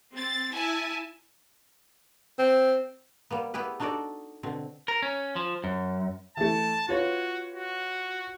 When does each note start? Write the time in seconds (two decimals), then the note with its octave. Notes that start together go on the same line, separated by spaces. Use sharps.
0.14 C4 A6
0.53 E4 G#5 A5
2.39 C4
3.30 G3 A#3 B3
3.54 B3 E4 G4 G#4 B4
3.80 D4 D#4 F#4 A4 D5
4.43 B2 D3 C4
4.88 A#4
5.03 C#4
5.36 F3
5.64 F#2
6.37 E3 A3 A5
6.89 F4 F#4 B4 C#5
7.53 F#4